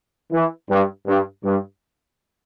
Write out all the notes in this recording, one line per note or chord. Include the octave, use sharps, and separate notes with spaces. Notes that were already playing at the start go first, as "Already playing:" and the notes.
E3
G2
G2
G2